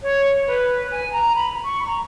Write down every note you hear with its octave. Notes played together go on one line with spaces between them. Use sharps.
C#5
B4
G#5
A#5
B5
C#6
B5
A#5